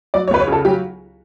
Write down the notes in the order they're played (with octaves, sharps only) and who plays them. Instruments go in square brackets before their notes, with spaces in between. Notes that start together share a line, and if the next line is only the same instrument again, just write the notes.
[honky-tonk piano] F#3 D5
C#5
C#2 B4
C#5
C#3 A4
F#3 G4